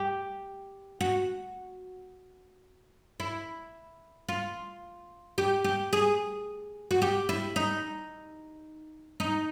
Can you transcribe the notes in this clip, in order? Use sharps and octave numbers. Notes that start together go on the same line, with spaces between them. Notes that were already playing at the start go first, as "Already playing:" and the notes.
Already playing: G4
F#4
E4
F4
G4
G4
G#4
F#4
G4
E4
D#4
D#4